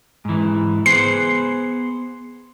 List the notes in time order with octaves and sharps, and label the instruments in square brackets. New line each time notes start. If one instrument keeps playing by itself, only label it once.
[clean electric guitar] G#2 E3
[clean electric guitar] B3 G#4 C5 [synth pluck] C7